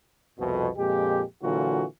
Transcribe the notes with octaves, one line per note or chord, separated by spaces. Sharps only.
C2 F2 B2
F2 A#2 G#3 G4
A#2 D3 E3 F#3 F4 F#4